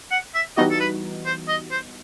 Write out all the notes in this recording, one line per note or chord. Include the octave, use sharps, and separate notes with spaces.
F#5
E5
E3 G3 B3 D#4 F#4 D#5
A4
B4
C5
D#5
C5